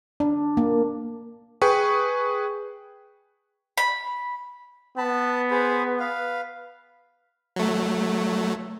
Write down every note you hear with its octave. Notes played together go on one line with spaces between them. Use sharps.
D4
A#3
G#4 B4 G5 C#6
B5
B3 A5 B5
G#4 B4 C5
B4 F5
F#3 A3